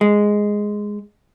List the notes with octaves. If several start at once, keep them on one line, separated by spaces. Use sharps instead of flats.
G#3